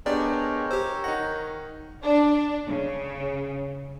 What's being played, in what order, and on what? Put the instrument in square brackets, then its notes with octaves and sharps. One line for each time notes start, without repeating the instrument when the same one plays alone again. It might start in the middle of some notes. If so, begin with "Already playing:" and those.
[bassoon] G#3 [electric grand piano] B3 D4 G4 [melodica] A#4 C#5 G5 [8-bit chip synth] D5
[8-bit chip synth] G4 C5 [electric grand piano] E6
[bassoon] D#3 [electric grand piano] D#4 F#5 [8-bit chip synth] A#6
[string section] D4
C#3